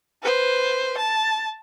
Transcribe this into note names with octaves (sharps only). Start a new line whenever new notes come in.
B4 C5
A5